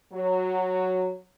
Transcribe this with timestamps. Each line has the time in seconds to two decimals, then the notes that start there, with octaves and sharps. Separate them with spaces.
0.13 F#3